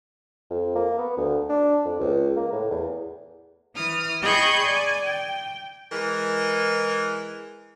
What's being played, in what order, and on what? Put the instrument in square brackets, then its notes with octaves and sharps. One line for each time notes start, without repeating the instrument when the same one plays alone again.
[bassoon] F2
A#3
B3
D2
D4
F2
C#2
A#3
A2
E2
[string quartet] E3 D#6 F6
G#4 D#5 G5 B5 C#6 G6
D5 G#5
G5
[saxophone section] E3 G#3 A#4